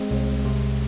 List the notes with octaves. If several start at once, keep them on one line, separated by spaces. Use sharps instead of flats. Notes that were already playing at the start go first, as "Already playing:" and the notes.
Already playing: G#3 C4
C2
C3